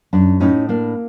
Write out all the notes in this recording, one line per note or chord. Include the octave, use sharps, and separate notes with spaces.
F#2 D4
A2 C#4 D#4
A#3 D4